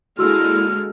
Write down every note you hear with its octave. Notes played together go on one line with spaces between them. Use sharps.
D3 G#3 A#3 E4 F#4 E6 F6